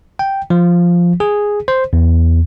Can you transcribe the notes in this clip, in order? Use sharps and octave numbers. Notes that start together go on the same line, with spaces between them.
G5
F3
G#4
C5
E2